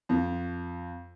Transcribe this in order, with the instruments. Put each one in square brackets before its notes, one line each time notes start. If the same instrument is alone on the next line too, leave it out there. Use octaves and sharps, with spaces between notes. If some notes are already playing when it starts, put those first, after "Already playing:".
[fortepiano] F2